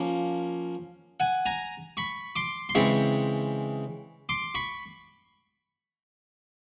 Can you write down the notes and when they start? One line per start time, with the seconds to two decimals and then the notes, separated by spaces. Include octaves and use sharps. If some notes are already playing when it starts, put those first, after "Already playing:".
Already playing: F3 A#3 C#4
1.20 F#5 G#5
1.46 G#5 A#5
1.97 B5 C#6
2.36 C6 D6
2.69 C6
2.75 C#3 E3 G#3 C4 B5 C#6
4.29 C6 D6
4.55 B5 C#6